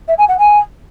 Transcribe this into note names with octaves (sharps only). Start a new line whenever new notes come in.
E5
G#5
F#5
G#5